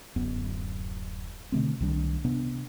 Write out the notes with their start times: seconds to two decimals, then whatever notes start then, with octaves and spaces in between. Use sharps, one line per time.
0.16 D1 F#2 B3
1.52 B2 D3 A3 C4
1.80 C2 D#3 G3 D4
2.25 C3 B3 D4